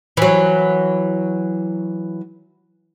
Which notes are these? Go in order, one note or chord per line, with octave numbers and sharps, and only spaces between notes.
E3 F#3